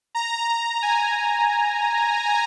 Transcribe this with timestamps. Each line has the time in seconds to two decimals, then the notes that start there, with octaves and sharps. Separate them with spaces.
0.15 A#5
0.82 G#5